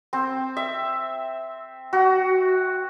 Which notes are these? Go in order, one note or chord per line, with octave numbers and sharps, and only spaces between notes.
C4
E5
F#4